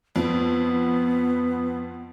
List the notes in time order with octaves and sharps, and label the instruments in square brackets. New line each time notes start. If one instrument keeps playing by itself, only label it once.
[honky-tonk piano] F2 [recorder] B3